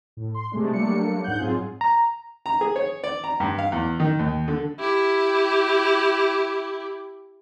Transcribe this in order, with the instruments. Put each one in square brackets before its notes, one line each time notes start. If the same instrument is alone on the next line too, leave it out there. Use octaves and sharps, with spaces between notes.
[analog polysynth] A2
C6
C3 G#3 A3 D4
F#3 G3 A3 A#3 D4 C#7
G#2 F#5 F#6 G6
G#2 F#3 C4 F4 G#4
[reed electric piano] A#5
[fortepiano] A#5
G#4
C#5
D5
A#5
G2
F5
E2
D#3
D#2
D3
[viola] E4 G4